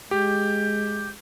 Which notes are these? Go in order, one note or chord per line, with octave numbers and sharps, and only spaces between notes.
G#3 G4 G6